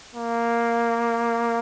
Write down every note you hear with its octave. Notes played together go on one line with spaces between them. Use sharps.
A#3